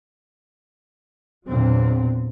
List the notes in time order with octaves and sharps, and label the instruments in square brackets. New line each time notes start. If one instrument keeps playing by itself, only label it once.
[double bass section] E2 A#2 D3 F#3 C4